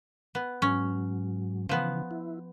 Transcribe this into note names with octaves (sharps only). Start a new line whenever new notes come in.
B3
G#2 F#3 C#4
C#3 E3 F3 B3
E4